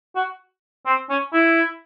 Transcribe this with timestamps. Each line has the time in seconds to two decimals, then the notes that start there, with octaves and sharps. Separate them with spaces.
0.16 F#4
0.86 C4
1.10 C#4
1.33 E4